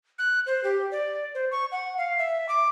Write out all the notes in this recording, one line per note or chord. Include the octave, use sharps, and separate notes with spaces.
F#6
C5
G4
D5
C5
C#6
F#5
F5
E5
D6